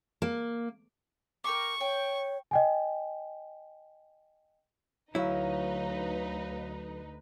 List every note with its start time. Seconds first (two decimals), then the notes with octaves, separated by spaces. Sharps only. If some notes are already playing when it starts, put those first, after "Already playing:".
0.22 A#3
1.44 A#4 G5 C#6 D6
1.80 C#5 G5
2.51 D#5 G5 G#5
5.15 D2 F#3 D#4 E4 B4 C#5 F5